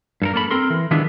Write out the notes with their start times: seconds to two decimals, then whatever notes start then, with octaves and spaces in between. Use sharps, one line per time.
0.22 G2 A4 A#4
0.34 A#3 C#4 A4 B5
0.51 C4 A4 A#4 C6
0.70 E3
0.91 D#3 F3 G#3 B3 D4 E4